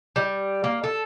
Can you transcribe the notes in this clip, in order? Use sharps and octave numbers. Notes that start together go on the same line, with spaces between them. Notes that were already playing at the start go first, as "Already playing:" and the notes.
G3
A#3
A4